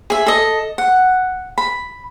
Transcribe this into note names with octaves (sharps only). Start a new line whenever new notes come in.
G#4 E5
A4 D#5
F#5
B5